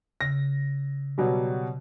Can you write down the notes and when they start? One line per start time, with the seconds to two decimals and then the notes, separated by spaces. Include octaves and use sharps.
0.21 C#3 A#6
1.18 B2 F#3 G3